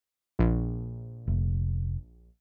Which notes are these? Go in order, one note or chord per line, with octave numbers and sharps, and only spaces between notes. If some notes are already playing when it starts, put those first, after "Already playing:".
A#1
F1